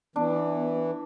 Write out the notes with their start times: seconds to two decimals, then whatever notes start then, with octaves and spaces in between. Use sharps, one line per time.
0.16 E3 B3 D4